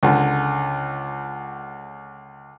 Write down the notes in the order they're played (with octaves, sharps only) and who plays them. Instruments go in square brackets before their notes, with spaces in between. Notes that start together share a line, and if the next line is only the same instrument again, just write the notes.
[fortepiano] C#2 D3